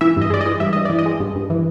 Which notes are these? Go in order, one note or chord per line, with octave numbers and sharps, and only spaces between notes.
E3 E5
G2 D#5
G#3 D5
E3 D#5
G2 E5
G2 D#5
E3 D5
D#5
G#3
G2
G2
E3